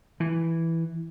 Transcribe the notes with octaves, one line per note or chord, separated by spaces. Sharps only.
E3